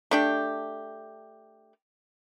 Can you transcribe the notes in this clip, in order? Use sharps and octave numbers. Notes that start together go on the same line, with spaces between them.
A3 D4 G4